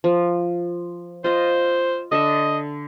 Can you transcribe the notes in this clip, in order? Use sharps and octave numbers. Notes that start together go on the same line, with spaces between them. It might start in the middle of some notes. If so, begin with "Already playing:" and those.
F3
F4 C5 D#5
D3 D4 D#5 E5